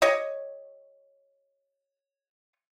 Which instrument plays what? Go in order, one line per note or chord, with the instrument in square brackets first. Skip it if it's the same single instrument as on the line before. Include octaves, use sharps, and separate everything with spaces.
[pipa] G4 C#5 D#5